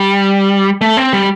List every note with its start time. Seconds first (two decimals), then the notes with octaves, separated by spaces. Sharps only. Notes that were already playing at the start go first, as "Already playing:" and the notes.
Already playing: G3
0.81 A3
0.97 C4
1.13 G3